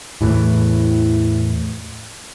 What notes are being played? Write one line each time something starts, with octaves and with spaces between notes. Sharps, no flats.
E2 A2 E3